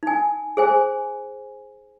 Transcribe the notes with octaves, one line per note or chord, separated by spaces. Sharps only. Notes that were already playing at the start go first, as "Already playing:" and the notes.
D#4 G#5
G#4 C5 G#5